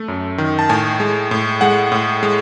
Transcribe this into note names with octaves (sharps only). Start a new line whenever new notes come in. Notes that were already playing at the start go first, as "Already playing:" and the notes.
Already playing: A3
F#2
D#3
A5
A2 G#5
G#3
A2
G#3 F#5
A2
G#3